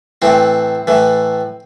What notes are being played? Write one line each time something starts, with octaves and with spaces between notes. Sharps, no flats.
A2 E3 C4
A2 E3